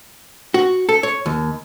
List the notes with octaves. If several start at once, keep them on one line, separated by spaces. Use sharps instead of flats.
F#4
A4
C#5
D#2